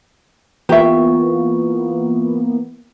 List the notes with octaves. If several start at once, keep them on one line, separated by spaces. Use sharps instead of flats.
E3 A#3 B3 F4 G4 E5 C#6